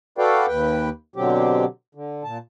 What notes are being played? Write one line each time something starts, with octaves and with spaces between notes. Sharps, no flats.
F#4 A4 B4 D5 F5 G5
D#2 B4 G5
B2 D3 F#3 C4 G4
D3
A#2 A5